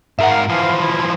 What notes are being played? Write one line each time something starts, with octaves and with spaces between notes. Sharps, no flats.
G#2 A#4 E5 F#5
F5
E3 F3 F5
E4